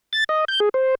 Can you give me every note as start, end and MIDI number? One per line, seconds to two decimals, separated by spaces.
0.13 0.24 93
0.29 0.45 75
0.48 0.60 91
0.60 0.69 68
0.74 0.95 72